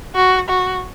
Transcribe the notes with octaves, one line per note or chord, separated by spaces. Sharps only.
F#4
F#4